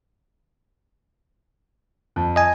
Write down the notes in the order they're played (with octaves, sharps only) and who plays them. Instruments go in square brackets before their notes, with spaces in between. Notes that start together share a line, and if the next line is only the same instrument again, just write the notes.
[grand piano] F2
[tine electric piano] D#5 G#5